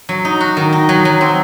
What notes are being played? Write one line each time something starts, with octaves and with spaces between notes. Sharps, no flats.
F#3
D#4
F#4
D#3
D#4
F#3
F#3
C4